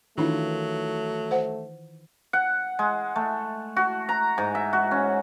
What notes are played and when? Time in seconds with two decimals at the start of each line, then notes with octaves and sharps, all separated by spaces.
0.18 D#3 E3 F#3 A3 D4 E4 F4
1.31 C5 F#5
2.33 F#5
2.79 G#3
3.16 A3
3.76 F#4
4.09 A#5
4.38 G#2
4.55 E5
4.73 F#4
4.91 C#4